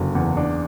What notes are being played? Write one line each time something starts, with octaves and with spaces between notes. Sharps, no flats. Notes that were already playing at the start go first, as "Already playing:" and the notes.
Already playing: F#1 D3 F#3
E2
D4